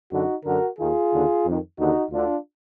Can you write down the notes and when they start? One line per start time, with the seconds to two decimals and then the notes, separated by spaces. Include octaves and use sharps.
0.11 F#2 D3 D#4 F#4
0.45 F#2 D3 F#4 A#4
0.78 D#2 D#3 F4 G#4
1.12 D#2 D3
1.45 F2 D#3
1.78 D#2 D3 D#4 F#4
2.12 D2 D3 D4 F4